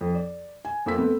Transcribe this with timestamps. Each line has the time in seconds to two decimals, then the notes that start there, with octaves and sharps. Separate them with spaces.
0.01 F2
0.15 D5
0.65 G#5
0.86 F2 F3 A#3 E6 B6
0.98 A3 B3 C4